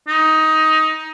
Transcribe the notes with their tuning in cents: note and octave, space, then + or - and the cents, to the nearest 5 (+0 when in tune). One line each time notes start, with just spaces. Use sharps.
D#4 +15